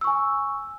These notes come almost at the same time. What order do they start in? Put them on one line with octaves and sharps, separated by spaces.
E6 C#6 G#5